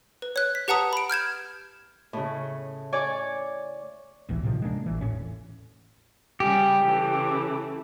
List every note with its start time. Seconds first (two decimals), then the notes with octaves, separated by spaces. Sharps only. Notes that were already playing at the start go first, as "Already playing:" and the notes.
0.22 B4
0.36 C#5 F#6
0.55 B6
0.68 G4 B4 F#5 A5 A#5 D#6
0.93 B5 D7
1.10 F6 G6 G#6 E7
2.13 A2 C#3
2.93 C#5 D5 G#5 D6
4.29 A1 D2 E3
4.43 A2 C3 D#3 F3
4.62 G#3 A#3 D4
4.86 A1 E3
5.01 E1 A2 C#4
6.40 C#3 G3 G4 G#4
6.82 C#3 E3 A3